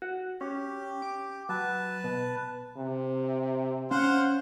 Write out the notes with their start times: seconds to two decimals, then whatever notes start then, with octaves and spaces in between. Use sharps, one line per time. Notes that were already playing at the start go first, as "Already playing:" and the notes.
0.02 F#4
0.41 C#4 G4
1.02 D6
1.49 F#3 B4 A5
2.04 B2
2.77 C3
3.91 C#4 C5 F5 F#5